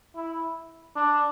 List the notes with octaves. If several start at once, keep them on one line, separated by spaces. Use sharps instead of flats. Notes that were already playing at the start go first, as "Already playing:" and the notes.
E4
D4